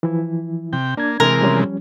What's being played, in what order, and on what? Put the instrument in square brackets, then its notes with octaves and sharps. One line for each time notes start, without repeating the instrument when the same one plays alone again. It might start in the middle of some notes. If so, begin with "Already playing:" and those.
[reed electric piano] E3 F3 E4
[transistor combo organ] C3 G5
[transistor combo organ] A#3 [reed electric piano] D4 G#6
[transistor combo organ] C3 E3 G#3 [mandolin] A#4
[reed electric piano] F3 G3 C#4